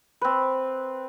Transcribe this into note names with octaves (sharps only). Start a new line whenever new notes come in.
C4 B4